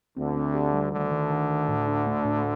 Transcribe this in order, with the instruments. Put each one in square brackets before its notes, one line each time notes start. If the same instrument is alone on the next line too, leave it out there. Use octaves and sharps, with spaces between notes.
[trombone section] D2 D3 [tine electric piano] C4
[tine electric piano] C4
G4
G3
[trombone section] D2 D3 [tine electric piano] D#3
[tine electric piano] D#3
D#3
D#3
A2
D4
A3
A2